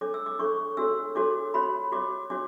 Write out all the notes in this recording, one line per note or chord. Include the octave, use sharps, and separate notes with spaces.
D4 A4 C#5 D6
E6
D6
D4 A4 C#5 C#6
D4 F#4 A4 C#5 E6
D4 F#4 A4 C#5 D6
F#4 C#5 B5
F#4 C#5 D6
D4 F#4 C#5 D6